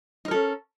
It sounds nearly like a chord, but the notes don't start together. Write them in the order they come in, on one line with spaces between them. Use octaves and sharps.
D#4 A#4 A4 C#4